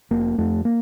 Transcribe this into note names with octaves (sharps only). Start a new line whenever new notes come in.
F1 A#3
F2 A3
A#3